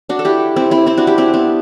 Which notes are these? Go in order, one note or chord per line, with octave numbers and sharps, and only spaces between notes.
D4 F#4
A4
E4 G4
C4 E4
C4 E4
C4 E4
D4 F#4
E4 G4
C4 E4
B3 D4